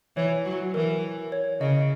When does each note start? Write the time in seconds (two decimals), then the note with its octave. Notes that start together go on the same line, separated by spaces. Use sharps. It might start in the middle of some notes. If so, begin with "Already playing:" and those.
0.16 E3 C#5
0.45 F#3
0.74 E3 A#4
1.32 C#5
1.61 C#3 D#5